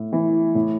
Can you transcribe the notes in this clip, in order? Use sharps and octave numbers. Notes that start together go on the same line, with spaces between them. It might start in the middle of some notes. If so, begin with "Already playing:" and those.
Already playing: A2
E3
A2